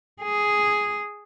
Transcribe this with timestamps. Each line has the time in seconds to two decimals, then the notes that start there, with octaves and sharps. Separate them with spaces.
0.22 G#4